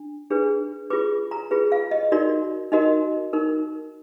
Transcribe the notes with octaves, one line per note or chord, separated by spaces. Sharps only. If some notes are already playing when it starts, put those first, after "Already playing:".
Already playing: D4
D4 G#4 B4
F4 G#4 B4 D6
A#5
F4 G#4 B4
F5
D#5
D#4 F#4 A#4 D5
D#4 F#4 A#4 D#5
D#4 A#4